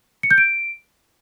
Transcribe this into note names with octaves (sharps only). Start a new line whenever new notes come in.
C#7
G6
D7